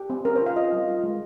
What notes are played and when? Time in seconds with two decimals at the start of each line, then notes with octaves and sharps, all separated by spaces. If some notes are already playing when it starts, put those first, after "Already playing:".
Already playing: G4
0.10 C4
0.25 C#4 A#4
0.36 C5
0.41 F4
0.46 F5
0.56 F4 D#5
0.72 G3
0.88 F4
1.04 G#3